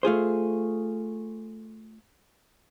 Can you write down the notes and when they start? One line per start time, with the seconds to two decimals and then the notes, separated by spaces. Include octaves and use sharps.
0.03 A3 F4 G#4 C5